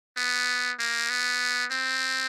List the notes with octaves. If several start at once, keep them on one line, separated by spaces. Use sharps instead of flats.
B3
A#3
B3
C4